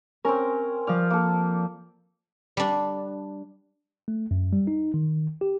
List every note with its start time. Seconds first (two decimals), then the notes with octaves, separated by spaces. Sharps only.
0.25 C4 C#4 A#4
0.87 F3 D5 F6
1.10 A#3 A4
2.57 G3 D4
4.08 A3
4.31 F#2
4.53 G3
4.67 D#4
4.94 D#3
5.41 G4